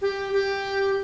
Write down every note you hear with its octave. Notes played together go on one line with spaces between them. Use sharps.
G4
G4